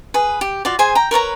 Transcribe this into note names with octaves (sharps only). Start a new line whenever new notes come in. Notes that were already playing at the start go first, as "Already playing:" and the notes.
G#4 B4
G4
F4 F#4 D5
G#4 C5 G#5
G5 A#5
A#4 B4 C#5 A#5